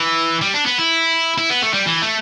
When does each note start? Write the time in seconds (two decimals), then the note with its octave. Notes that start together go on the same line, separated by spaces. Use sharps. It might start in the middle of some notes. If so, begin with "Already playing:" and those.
Already playing: E3
0.42 G3
0.54 D4
0.66 B3
0.78 E4
1.38 E4
1.50 B3
1.62 A3
1.74 G3
1.87 E3
2.02 A3